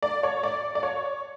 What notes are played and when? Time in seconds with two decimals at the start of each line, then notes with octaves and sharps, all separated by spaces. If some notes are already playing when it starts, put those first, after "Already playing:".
0.03 D5
0.23 C#5
0.43 D5
0.75 D5
0.83 C#5